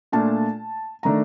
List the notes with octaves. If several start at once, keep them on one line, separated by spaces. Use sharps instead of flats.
A#2 A3 D4 F4 A5
D#3 A3 D4 A#5